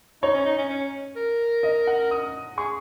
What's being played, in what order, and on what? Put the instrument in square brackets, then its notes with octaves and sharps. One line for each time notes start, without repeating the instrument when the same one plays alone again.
[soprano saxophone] D#4 [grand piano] C#5
[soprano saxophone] C#4
D#4
C#4
C#4
A#4
[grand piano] D#5
F#5
D#6
[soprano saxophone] G#4 [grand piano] C#6